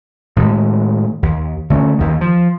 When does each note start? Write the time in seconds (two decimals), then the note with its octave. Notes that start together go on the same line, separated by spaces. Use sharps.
0.36 A2 D#3 G#3
1.23 D#2
1.70 D3 A3 C#4
1.99 D#2 D#3
2.21 F3